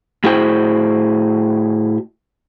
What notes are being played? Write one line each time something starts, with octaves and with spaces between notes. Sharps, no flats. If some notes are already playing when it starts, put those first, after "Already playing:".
A2 E4 F#4 G#4 C5 G5